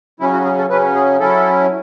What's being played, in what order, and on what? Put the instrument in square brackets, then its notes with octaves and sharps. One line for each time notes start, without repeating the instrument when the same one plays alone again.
[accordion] C#3 F#3 C#4 E4
F#4
G#4
A4
C#3 F#3 C#4 B4
G#4
F#3 C#4 E4 A4